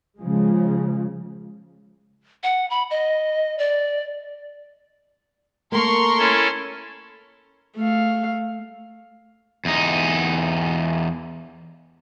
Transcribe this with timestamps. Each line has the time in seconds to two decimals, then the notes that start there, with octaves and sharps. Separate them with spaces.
0.18 C#3 F3 G#3
2.43 F#5
2.70 B5
2.91 D#5
3.58 D5
5.72 A3 A#3 A#4 C6 C#6
6.18 C#4 E4 A4
7.76 A3 F5
9.65 E2 D#4